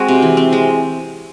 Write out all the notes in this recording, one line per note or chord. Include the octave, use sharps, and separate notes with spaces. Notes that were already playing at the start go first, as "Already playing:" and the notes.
Already playing: G#3 C4 F#4
C3
E3
C4
G#3